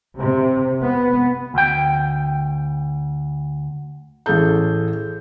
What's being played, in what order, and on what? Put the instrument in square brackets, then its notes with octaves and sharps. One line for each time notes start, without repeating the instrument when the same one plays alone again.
[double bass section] C3
B3
[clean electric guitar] D2 G5
[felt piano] A1 G#4 A4 G6